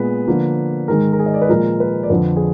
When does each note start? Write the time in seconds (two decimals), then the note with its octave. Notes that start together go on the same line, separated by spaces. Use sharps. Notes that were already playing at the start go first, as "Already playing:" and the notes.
Already playing: A#2 G#3 B3 B4
0.28 D3 F3 A#3
0.88 G#2 D#3 G#3 A#4
1.13 A#4
1.19 G#4
1.26 D#5
1.34 D5
1.42 B4
1.49 A#2 F3 G#3 A#4
1.80 B4
2.03 D5
2.10 F2 D3 F3 B4
2.36 G#4